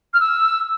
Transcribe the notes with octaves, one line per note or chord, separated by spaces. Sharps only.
F6
E6